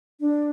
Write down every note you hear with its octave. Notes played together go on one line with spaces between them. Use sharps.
D4